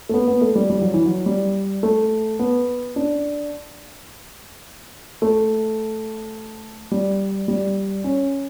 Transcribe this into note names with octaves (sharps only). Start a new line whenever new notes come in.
A3
B3
B3
A3
G3
G3
F#3
E3
F#3
G3
A3
B3
D4
A3
G3
G3
C#4